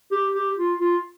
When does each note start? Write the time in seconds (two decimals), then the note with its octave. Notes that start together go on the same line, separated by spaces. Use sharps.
0.12 G4
0.34 G4
0.58 F4
0.80 F4